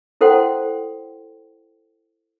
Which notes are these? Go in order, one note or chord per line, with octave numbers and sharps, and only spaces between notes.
E4 A4 C5 F#5 G5 C6